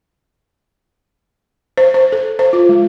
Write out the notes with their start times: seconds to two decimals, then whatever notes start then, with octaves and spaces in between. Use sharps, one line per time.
1.78 C5
1.94 C5
2.12 A4
2.39 C5
2.53 F4
2.69 G#3